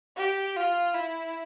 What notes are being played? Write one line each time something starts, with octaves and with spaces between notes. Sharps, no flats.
G4
F4
E4